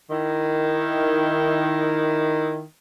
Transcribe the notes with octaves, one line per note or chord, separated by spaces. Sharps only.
D#3 E4